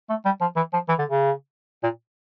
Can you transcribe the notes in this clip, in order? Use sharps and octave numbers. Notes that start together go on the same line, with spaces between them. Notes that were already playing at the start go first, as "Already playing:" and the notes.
A3
G3
F3
E3
F3
E3
D3
C#3
A#2